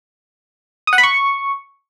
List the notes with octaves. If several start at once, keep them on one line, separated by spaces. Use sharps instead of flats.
D#6
F#5
B5
C#6